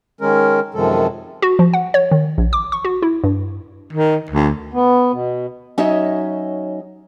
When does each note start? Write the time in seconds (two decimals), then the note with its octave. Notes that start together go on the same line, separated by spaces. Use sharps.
0.21 D#3 G#3 C#4 A#4
0.74 F#2 C3 D#3 F3 G#3 A4
1.42 F#4
1.59 F3
1.73 F#5
1.94 C#5
2.11 D#3
2.38 A#1
2.53 D6
2.72 C#6
2.85 F#4
3.02 E4
3.24 G2
3.93 D#3
4.31 D2
4.71 B3
5.12 B2
5.78 F#3 C#4 D#4 C#5 D#5 E5